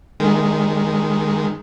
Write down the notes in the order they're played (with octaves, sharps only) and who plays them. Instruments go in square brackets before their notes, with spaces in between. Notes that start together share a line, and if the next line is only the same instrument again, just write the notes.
[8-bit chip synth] D#3 G#3